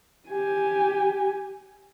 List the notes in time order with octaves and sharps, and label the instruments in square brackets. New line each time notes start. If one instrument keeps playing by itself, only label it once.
[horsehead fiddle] G4 G#5